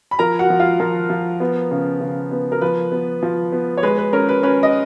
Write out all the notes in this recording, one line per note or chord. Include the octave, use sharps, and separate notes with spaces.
B5
F3 A#4 A#5
F#4 F#5
F3
F4 F5
F3 A#4
F3
B3
C#3
C#3
B3
A#4
F3 B4
B3
F3
B3
C#5
G#3 B4
B4
C#4 A#4
B4
C#4 B4
D#5